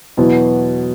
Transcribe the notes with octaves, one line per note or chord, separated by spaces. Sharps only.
E2 B2 F#3 B3 E4